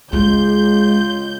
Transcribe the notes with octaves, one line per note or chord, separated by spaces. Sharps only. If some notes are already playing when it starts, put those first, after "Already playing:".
C#2 G#3 F4 G#4 G6